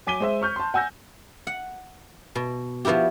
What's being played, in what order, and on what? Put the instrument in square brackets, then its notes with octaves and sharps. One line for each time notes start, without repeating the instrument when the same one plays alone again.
[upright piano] F#3 G#5 D6 B6 D#7 G7
G#3 C5 E5
C#6 F6 G6
A5 C6
F#5 G#5 E6 G6 A#6
[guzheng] F#5
B2
F3 B3 E4 F#4 G4